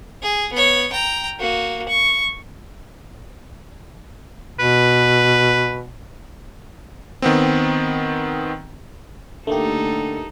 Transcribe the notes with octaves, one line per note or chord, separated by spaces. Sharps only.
G#4
B3 C#5
G5 A#5
A#3 F#4
C#6
B2 B4
D#3 B3 C4
D3 A3 A#3 D#4 G4 A4